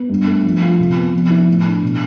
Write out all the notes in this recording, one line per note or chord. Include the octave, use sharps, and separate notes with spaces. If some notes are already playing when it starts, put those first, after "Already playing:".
Already playing: B3
G2
A3
F3
F4
C3
B3
F3
E4
A2
D4
B2